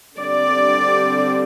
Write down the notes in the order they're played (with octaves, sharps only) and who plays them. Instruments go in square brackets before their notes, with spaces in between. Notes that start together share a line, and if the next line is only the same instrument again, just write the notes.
[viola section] D3 G3 C4 D5